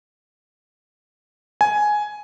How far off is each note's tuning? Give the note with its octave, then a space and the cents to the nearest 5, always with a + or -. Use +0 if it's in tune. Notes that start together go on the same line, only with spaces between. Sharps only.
G#5 +10